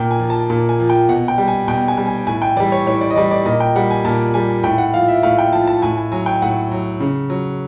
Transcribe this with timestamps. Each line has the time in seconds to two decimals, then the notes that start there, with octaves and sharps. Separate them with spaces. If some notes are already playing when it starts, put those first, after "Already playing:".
Already playing: A#2 G5
0.11 G#5
0.20 F3
0.30 A5
0.50 A#2
0.69 G#5
0.80 F3
0.90 G5
1.09 B2 F#5
1.28 G5
1.38 G3
1.48 G#5
1.68 B2 G5
1.88 G#5
1.97 G3
2.07 G#5
2.27 A2 G#5
2.42 G5
2.56 E3 G3 D5
2.72 C#5
2.86 A2 C#5
3.01 D5
3.10 D#5
3.16 E3 G3 D5
3.31 D5
3.45 A#2 D#5
3.60 G5
3.76 G3 F#5
3.91 G#5
4.05 A#2 A5
4.34 G3 G#5
4.63 A2 G5
4.78 F#5
4.94 F3 F5
5.08 E5
5.23 A2 F5
5.38 G5
5.52 F3 A5
5.67 A5
5.82 A2 G#5
5.97 G#5
6.12 F#3 G#5
6.26 G5
6.42 A2 F#5
6.72 F#3
7.00 C#3
7.30 F#3